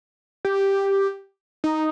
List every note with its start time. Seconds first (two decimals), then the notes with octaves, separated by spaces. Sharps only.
0.45 G4
1.64 D#4